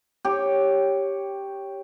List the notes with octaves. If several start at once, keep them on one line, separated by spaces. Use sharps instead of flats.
G4 C#5